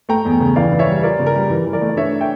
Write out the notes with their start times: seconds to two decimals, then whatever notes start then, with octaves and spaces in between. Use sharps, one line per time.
0.09 A3 G5 A#5
0.25 E2
0.40 C#3
0.56 E3 D5 F5
0.72 E3
0.79 C#5 E5
0.87 G3
1.03 F4 A#4 D5
1.19 C#3
1.26 A#4
1.35 G3
1.50 E3
1.66 E3
1.73 A#4 D5
1.81 A3
1.89 D5
1.97 D4 C#5 E5
2.20 E5 G5